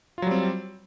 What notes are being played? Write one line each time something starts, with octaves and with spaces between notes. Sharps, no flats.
F#3 G3 C4 F4